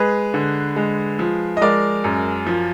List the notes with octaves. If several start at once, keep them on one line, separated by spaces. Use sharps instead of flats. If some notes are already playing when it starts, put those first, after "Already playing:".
Already playing: G#3 G#4 B4
D3
G#3
F3
D#5
G#3 A#4 D5
F#2
F3